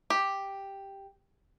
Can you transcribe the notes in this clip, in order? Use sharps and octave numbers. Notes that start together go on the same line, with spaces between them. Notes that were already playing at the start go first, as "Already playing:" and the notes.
G4